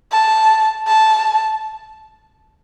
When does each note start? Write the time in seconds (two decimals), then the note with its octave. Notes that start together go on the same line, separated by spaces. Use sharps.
0.12 A5
0.87 A5